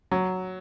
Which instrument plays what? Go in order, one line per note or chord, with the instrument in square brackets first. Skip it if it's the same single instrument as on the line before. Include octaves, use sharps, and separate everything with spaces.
[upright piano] F#3